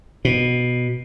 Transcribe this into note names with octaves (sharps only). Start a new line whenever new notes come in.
B2